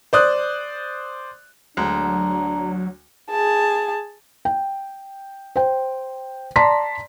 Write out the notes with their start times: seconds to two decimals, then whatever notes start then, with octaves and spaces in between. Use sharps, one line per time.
0.13 C5 D5 D#6 F#6
1.77 D2 F#3 G#3 D4 A#5
3.30 G#4 A5
4.45 G5
5.56 C5 G5
6.56 D5 A5 A#5 C6 B6